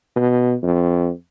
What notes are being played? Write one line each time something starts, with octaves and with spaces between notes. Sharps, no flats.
B2
F2